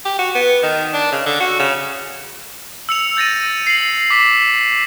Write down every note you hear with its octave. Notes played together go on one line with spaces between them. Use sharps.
G4
F#4
B3
D#3
D4
C#3
D3
F#4
C#3
E6 C#7 F7
G6 A6 A#6 D#7
C7 F#7
D6 B6